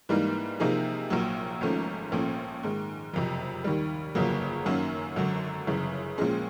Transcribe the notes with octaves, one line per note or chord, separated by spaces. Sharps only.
G#2 E3 G3 A#3 D#4
C3 F3 A#3 D#4 G#4
A#1 A#2 F#3
G#1 G#2 F3 A3 C#4
A#1 A#2 F3 A3 C#4
G#2 D#3 G#3
F#1 F2 C3
D#2 D#3 G3
G1 F2 C#3 F#3 A#3
F#2 D#3 F#3 A#3 C#4
G#1 F#2 D3 F#3
G1 F#2 C#3 E3
A#1 A#2 F3 G#3 C#4